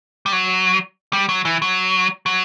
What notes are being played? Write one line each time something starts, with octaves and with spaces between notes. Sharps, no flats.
G3
F#3
G3
F#3
E3
F#3
F#3